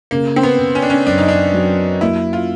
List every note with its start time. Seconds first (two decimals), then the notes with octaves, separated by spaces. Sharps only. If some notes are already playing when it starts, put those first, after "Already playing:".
0.11 C#3 A#3
0.36 C4
0.43 B3
0.59 C#3
0.75 C#4
0.82 D4
0.90 C#4
1.07 F#2 D4
1.18 D#4
1.29 D4
1.53 F#3
2.01 A#3 E4
2.33 F4